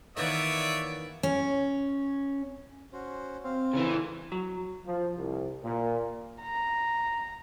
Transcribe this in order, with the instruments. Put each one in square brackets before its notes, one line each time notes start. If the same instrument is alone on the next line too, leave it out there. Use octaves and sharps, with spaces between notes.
[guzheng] D#3 E3 A#3 [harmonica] B3 C#5 E5 [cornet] D5
[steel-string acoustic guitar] C#4
[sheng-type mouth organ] C#4 F#4 C5
[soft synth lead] C4 [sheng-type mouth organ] C5 F5
[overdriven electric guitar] C#3 E3
[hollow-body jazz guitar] F#3
[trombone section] F3
C2
A#2
[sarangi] A#5